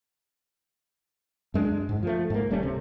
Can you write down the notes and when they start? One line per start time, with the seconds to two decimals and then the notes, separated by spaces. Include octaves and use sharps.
1.54 F#2 G#3 D4
1.89 G#2
2.03 F3 A3
2.30 G#2 A#3
2.51 D1 G3 A3 C#4
2.63 C3